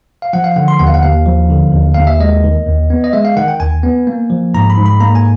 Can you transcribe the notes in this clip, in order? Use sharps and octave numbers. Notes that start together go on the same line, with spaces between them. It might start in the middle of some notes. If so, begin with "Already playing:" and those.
F5
F3 F#5
F5
D3 F#5
C6
D#2 F#5
F5
F#5
D#2 F5
F3
D3
D#2
D#2 F5
E5
G#3 D#5
D#3
D#2
B3
D#5
G#3 E5
F5
D#3 F#5
G5
D#2 G#5
B3
A#3
F3
G#2 A#5
B5
G#2
B5
A#3 A#5
G#5